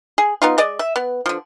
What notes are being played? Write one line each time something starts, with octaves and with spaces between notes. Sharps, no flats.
G#4
B3 D#4 F4
G#3 D5 D#5
E5
B3
D3 F3